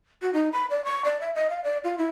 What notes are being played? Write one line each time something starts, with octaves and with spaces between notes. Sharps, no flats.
F#4
D#4
B5
D5
C#6
D5
E5
D#5
F5
D5
F4
E4